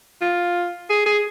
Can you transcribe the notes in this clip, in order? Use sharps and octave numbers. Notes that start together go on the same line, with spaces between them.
F4
G#4
G#4